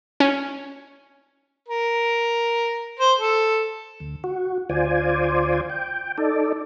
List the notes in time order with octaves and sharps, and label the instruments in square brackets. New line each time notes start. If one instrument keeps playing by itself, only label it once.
[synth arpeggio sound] C#4
[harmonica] A#4
C5
A4
[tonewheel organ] D2
F#4
D2 F4 C5 D5 G#5
G5
D#4 A4 D5